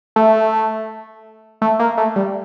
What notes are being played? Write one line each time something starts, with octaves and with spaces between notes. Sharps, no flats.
A3
A3
A#3
A3
G3